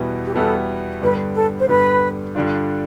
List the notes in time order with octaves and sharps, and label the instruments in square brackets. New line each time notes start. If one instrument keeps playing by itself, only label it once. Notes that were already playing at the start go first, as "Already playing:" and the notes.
Already playing: [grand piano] E2 B2 G3 B3 E4
[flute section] G4
[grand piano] E2 B2 G3 B3 E4 [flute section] A4
[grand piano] G2 D3 G3 B3 [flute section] B4
[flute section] A4
C5
[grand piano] G2 D3 G3 B3 [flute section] B4
[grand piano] G2 D3 G3 D4 F4